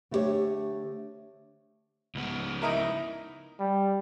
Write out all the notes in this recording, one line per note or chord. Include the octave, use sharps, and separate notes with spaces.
D3 A3 E4 G4 C5 C#5
C#2 B3
D#4 E4 A#4
G3